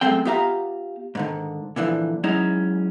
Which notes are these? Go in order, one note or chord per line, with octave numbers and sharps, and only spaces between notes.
F#2 F3 G#3 A3 C4 G5
B3 F4 G4 E5 F5 A#5
G#2 D3 D#3
A#2 D3 E3 F3
F#3 G#3 C#4 D#4 E4